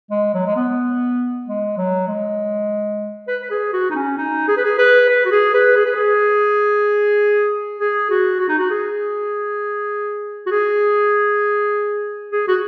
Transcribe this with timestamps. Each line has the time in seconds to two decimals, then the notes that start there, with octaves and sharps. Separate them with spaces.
0.11 G#3
0.34 F#3
0.46 G#3
0.56 B3
1.47 G#3
1.77 F#3
2.08 G#3
3.28 B4
3.42 B4
3.50 G#4
3.73 F#4
3.90 D#4
3.95 C#4
4.18 D#4
4.48 G#4
4.57 B4
4.65 G#4
4.78 B4
5.09 B4
5.25 F#4
5.31 G#4
5.54 B4
5.76 G#4
5.85 B4
5.95 G#4
7.79 G#4
8.10 F#4
8.40 F#4
8.49 D#4
8.58 F#4
8.70 G#4
10.46 F#4
10.51 G#4
12.32 G#4
12.48 F#4